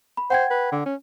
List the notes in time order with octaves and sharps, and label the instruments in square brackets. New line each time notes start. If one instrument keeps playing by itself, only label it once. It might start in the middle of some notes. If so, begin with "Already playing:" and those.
[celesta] B5
[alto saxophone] C5 [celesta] F#5 G5 G#6
[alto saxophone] B4
D3
C#4